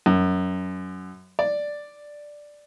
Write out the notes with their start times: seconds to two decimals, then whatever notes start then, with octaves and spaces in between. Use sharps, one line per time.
0.06 F#2
1.39 D5